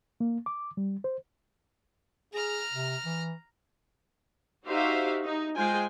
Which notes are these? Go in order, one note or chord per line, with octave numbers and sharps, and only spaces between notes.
A#3
D6
G3
C5
G#4 A#5 F6
C3
E3
D#4 F#4 G4 C5 E5 F5
D#4
G#3 F4 C5 G5 G#5